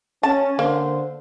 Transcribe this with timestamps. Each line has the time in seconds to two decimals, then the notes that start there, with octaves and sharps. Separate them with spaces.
0.23 C#4 A5
0.59 D3 A#3 C5